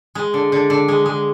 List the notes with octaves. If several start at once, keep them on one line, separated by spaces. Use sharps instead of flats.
G#3
D3
D3
D3
G#3
G#3